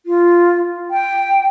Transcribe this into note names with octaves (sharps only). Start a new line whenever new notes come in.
F4
G5